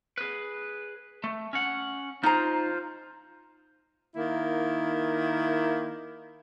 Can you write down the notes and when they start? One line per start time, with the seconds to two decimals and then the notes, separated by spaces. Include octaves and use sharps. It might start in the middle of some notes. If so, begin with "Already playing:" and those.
0.18 G#4 B4
1.24 A3
1.53 C#4 F#5
2.23 D#4 F4 C5 A#5
4.15 D#3 A#3 E4